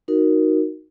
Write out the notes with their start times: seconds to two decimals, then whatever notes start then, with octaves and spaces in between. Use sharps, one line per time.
0.08 D#4 F#4 A#4